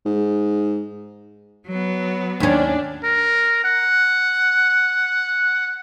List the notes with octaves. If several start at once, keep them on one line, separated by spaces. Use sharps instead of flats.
G#2
F#3 B3
D#2 C#4 D4
A#4
F#5